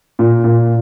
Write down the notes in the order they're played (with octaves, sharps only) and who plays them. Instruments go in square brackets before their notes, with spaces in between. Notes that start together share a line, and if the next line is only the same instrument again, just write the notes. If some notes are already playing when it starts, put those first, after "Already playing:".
[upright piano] A#2
A#2